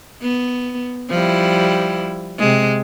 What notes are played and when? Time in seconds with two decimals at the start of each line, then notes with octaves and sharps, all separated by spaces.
0.22 B3
1.10 F3 G3 E4
2.39 C3 G#3